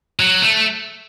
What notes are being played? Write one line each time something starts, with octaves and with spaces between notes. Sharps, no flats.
F#3
A3